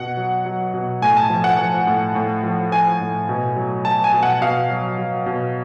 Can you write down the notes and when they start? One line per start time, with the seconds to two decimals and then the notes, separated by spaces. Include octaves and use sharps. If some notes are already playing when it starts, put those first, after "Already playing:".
Already playing: B2 F#5
0.17 F#3
0.45 F#3
0.74 B2
1.02 A2 G#5
1.17 A5
1.30 F3
1.44 F#5
1.58 F3
1.87 A2
2.15 A2
2.43 F3
2.71 F3 G#5
3.00 A2
3.29 B2
3.56 F#3
3.85 F#3 A5
4.04 G#5
4.13 B2
4.23 F#5
4.41 B2 F5
4.70 F#3
4.98 F#3
5.26 B2